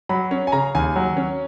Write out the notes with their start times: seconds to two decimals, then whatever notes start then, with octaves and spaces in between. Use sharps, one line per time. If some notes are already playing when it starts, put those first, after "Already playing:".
0.09 F#3 B5
0.31 C#4
0.47 G#5
0.52 C#3 A#5
0.75 D#2 G#5
0.96 F#3
1.17 C#4